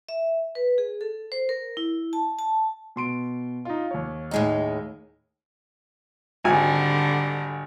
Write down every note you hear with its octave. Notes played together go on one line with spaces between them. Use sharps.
E5
B4
G#4
A4
C5
A#4
E4
A5
A5
B2 C6 D7
D#4 F4
D#2 C#5
A2 G#3 D#4
G#1 D3 G3 G#5